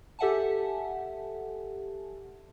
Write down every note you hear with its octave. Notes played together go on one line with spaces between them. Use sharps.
G4 A4 E5 F#5 G#5 A5